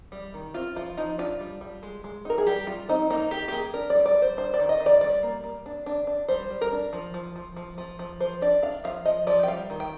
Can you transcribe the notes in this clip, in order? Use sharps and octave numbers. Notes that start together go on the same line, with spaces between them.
G3
D#3
C4 F4
F3 F4
F3 D#4
D4 F4
G3
G3
G#3
G#3
D#4 A#4
G#4
G3 G4
G3 F4
C4 D#4
A#3 D#4
D#3 G4
G4
A#3 G#4
D4 A#4
G3 D5
D5
G3
C5
D4 C5
D5
D#3
D#5
D#3
D5
G3 D5
A#3
A#3
D4
D4
D4
G3 C5
G3
A#4
D4
F3
F3
F3
F3
F3
F3
F3 C5
D4 D5
D4 F5
F3 F5
F3 D#5
F3 D5
G5
G3 F5
D#3
G5